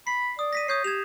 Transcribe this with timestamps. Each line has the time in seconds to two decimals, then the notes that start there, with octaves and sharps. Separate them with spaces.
0.07 B5 C7
0.39 D5 D#6
0.53 A#6 B6 D#7
0.68 C#5 D#6 G6 C7
0.84 G4 G#6 E7 F7